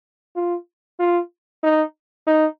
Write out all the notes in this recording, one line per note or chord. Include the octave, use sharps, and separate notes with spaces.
F4
F4
D#4
D#4